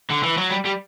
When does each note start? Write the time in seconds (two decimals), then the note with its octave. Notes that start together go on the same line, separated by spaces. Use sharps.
0.10 D3
0.23 E3
0.37 F#3
0.50 G3
0.65 G3